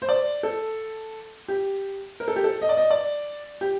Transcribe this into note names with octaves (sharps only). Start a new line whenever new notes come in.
C5
D5
A4
G4
A#4
A4
G4
A4
D#5
D5
D#5
D5
G4